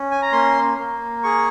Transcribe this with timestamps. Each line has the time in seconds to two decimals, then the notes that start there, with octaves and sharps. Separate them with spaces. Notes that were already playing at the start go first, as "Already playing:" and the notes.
Already playing: C#4
0.11 G#5
0.22 A#5
0.32 A#3 C6
0.78 A#3
1.23 G#4 C#6